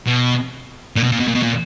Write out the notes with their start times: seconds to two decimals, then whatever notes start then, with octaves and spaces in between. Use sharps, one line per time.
0.06 B2
0.96 A#2
1.04 B2
1.12 A#2
1.20 B2
1.28 A#2
1.35 B2
1.42 A#2